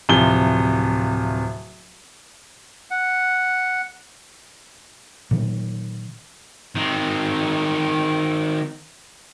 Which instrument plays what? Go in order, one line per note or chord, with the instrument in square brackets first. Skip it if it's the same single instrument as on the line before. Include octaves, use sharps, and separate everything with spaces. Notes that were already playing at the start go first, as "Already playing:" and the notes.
[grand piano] D1 C3 F3 G7
[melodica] F#5
[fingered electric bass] A#2 D#3 F#3
[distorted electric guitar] D#3 C4